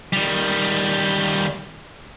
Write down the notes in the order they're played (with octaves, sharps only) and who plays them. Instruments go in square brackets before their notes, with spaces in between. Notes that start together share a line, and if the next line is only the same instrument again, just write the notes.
[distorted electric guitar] D#3 G3